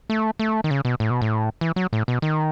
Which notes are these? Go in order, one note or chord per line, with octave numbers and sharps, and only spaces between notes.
A3
A3
D#3
C#3
B2
A2
B2
A2
E3
F#3
A2
B2
D#3